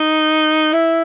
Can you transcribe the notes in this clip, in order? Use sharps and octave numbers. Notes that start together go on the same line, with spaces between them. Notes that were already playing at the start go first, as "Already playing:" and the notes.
Already playing: D#4
E4